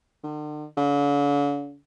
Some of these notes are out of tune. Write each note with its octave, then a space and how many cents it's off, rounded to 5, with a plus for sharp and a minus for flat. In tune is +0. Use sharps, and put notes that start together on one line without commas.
D3 +45
D3 -45